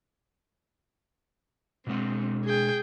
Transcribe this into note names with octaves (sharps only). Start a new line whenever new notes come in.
B2 G#3 C4 F#5
G#4 G5